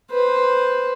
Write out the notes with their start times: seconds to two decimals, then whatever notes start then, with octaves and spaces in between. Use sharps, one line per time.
0.11 B4 C5